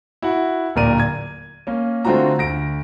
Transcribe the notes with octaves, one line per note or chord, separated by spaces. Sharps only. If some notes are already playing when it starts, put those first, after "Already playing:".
E4 F#4 F#5
D1 A#2 A#4 D5 D#7
G#6
A#3 C#4
D3 A3 C4 F4 F#4 A#5
D2 A#6 D7